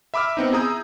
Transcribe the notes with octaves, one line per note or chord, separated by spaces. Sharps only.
E5 B5 D6 E6 F6
B3 C4 D#4
E4 G#4 A#5 D#6 E6 G6